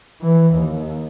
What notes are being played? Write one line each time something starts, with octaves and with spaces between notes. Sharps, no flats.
E3
D#2